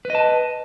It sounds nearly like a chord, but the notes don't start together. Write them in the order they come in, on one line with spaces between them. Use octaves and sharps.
B4 D#5 A5